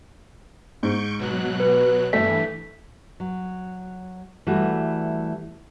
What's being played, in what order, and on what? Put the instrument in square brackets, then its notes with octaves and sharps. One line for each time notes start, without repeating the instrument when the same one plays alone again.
[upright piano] G#2 [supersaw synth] C#6 G6 D7
[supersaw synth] B2 F#3 F#6
[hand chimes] B4
[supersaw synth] G2 E3 [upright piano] A3 [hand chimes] B6
[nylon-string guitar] F#3
E3 G3 A3 F#4